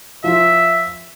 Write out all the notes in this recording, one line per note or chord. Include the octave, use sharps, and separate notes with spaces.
F3 F4 E5